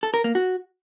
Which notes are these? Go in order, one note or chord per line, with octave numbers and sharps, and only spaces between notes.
A4
A#4
A#3
F#4